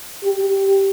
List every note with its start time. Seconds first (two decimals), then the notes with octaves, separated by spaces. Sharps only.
0.23 G4